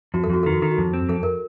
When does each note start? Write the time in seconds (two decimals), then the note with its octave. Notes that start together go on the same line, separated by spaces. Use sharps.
0.14 F2 F#4
0.24 A4
0.30 F2 F#4
0.43 D#3 A4
0.53 F#4
0.62 D#3 A4
0.71 F#4
0.78 F2
0.93 C4
1.09 F2 A4
1.23 A#4